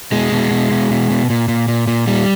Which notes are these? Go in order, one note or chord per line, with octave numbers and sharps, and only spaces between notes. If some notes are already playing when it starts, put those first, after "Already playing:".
B2 G#3
B2
B2
B2
B2
B2
A#2
A#2
A#2
A#2
A#2 G3